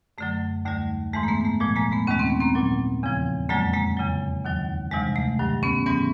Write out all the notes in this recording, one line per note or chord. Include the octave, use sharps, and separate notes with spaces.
F#2 D3 F#3 A3
D#2 D3 G3 A3
G#2 E3 G#3 A3
A#3
A3 B3
A#3
A3
A#2 F3 G#3
G#3 A#3
A3 B3
D#2 D#3 G#3 C#4
C4
B3
A#3 C4
A#2 F#3
E2 C#3 F3
F2 D3 F#3 G#3 A#3
G#3 A#3
E2 C#3 F#3
D#2 D#3 F#3
D2 C3 E3 G3 G#3
A3
G2 D#3 F#3
B3 C#4
G#2 E3 G3 B3 C#4